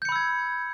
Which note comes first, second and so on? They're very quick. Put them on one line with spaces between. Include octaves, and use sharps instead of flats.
G6 C#7 B5 E6 G#6